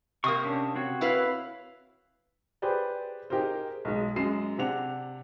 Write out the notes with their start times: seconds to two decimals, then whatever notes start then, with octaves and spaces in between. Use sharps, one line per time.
0.24 C3 A#3 C#6 D#6
0.45 C#4 D4
0.75 C4 F#4 C#5
1.01 E4 B4 F5
2.62 G4 G#4 B4 C5 D5
3.30 D#4 G4 G#4 A#4 C5
3.85 B1 G#3
4.16 F#2 G#3 C7 E7
4.58 C3 D4 F#5 F7